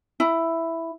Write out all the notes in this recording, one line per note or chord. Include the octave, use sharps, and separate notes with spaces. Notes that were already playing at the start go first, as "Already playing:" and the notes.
E4